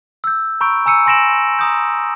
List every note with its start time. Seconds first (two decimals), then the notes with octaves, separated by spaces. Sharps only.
0.24 E6 G6
0.61 A#5 B5 C#6 E6 G6 D7
0.86 G#5 A#5 E6 C#7 D#7
1.06 G#5 C6 A#6 D7 E7 F#7
1.59 A#5 D#6 G6